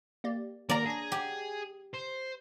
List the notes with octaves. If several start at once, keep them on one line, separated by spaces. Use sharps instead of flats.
A#3 G4 D5
D#3 A#3 A#4 D5 A#5
D4 G#4 A#6
G4
C5